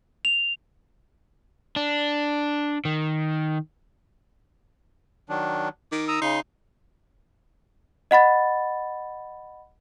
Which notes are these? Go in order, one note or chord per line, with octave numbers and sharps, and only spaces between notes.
F7
D4
D#3
D#3 F#3 D4
D#3 D6
A#5 D#6 E6
C#3 D#4 C6
D#5 F#5 B5 A6